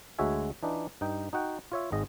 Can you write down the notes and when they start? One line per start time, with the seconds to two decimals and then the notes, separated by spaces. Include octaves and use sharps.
0.18 D2 G#3 F#4 C#5 E5 G#5
0.63 E3 D4 D#4 F4
1.01 G2 D#4 G5
1.33 D#4 F#4 F#5 G5
1.72 F4 C#5 E5
1.92 G#1 G#2 G#3 D#5